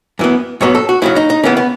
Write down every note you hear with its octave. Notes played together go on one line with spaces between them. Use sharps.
F#2 E3 B3
G#2 F#3 B3 C#5
A4
F#4
F#2 C#3 F#3 E4
D#4
D#4
C#3 E3 B3 C#4
B3